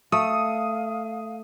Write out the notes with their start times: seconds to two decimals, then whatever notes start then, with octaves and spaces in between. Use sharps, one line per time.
0.12 A3 F5 D#6